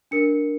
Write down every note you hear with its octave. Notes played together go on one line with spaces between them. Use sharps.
D4 A#4 C#7